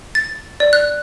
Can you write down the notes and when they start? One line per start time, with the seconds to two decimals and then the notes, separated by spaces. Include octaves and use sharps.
0.15 A6
0.60 D5
0.73 F#6